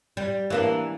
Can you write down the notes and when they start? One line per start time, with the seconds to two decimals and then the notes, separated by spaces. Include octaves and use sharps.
0.17 G3
0.50 E3 A#3 D4